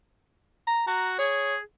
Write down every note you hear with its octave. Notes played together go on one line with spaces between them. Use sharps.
A#5
F#4 A#5
G#4 C#5